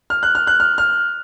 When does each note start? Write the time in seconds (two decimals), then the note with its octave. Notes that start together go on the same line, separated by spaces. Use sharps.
0.10 F6
0.23 F#6
0.35 F6
0.47 F#6
0.60 F6
0.78 F6